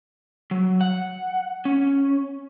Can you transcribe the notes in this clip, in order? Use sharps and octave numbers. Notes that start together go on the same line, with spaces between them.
F#3
F#5
C#4